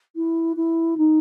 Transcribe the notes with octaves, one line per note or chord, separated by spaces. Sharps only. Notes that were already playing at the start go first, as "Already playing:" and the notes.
E4
E4
D#4